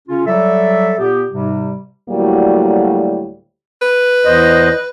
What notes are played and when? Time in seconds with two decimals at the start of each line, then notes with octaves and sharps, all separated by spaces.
0.08 C#3 C#4 F4
0.26 F#3 G3 A4 D5 E5
0.98 A#2 B3 G4
1.31 G#2 C3 G3
2.09 D2 A2 F#3 G3 A#3
3.82 B4
4.25 E2 C5 D#5